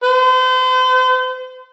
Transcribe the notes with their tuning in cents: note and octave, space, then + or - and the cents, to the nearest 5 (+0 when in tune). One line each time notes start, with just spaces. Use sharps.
C5 -40